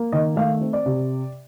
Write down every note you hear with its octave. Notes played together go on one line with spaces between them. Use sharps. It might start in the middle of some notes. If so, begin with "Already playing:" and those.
Already playing: A#3
D#3 D#5
A3 F5
C4
D5
C3